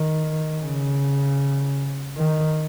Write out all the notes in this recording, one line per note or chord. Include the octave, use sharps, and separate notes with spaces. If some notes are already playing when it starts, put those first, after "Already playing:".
Already playing: D#3
C#3
D#3